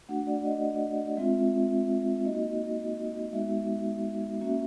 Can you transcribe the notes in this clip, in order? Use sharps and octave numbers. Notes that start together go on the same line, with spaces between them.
A3 D4 F#4 F#5
D5
D#5
G#3 C4 F4 E5
A#3 D#4 F#4 D#5
G#3 B3 D#4 F#4 E5
A#3 C#4 F#4 E5